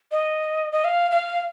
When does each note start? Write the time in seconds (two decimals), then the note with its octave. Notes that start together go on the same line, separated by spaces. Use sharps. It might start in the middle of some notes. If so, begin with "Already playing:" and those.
0.12 D#5
0.72 D#5
0.84 F5
1.11 F5